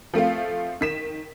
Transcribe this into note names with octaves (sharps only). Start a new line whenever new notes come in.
F3 A3 C4 F4
D#3 B6 E7